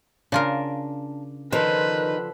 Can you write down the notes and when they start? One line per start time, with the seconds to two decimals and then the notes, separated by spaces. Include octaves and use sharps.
0.32 C#3 D4 F4 A#4
1.52 D3 D#3 F3 B4 C5